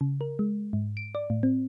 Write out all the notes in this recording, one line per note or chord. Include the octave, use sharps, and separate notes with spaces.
C#3
A#4
G#3
G#2
D7
D5
A2
C4